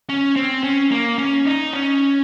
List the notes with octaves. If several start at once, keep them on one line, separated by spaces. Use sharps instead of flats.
C#4
C4
C#4
A#3
C#4
D#4
C#4